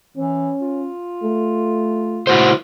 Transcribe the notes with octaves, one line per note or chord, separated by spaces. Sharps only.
E3 C#4
F4
A3
E4 F#4 C5